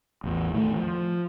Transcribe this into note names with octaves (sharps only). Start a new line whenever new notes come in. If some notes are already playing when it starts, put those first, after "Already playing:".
A1 E2
A2 D#3 G3 A3
F3